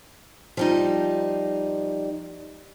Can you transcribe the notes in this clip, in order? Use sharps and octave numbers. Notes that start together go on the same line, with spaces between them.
F3 G3 D#4